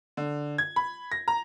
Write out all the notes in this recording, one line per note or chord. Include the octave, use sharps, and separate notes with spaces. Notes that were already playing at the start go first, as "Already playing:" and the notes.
D3
G#6
B5
A#6
A#5